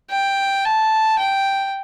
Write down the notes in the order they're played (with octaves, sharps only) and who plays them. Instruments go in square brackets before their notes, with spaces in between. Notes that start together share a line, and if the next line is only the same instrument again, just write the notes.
[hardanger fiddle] G5
A5
G5